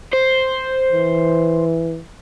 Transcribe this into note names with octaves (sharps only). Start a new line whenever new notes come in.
C5
E3